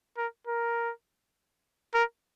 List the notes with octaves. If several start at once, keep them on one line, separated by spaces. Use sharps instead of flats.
A#4
A#4
A#4